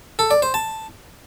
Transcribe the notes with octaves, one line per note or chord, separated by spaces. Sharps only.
A4
D5
C5
A5